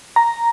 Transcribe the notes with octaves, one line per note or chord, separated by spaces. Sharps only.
A#5